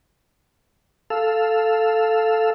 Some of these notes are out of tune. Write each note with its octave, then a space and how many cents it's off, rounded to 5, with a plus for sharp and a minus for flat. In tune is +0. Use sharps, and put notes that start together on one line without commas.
A4 +0 F5 +0 E6 +0